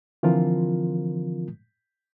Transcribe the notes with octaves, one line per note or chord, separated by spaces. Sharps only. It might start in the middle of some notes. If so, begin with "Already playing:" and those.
D3 E3 F3 C4 F4 A#4